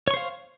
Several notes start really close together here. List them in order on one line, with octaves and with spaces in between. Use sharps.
C#5 C#6 C5 F5